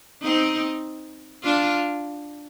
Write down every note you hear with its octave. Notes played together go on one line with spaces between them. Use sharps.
C4 D#4
D4 F4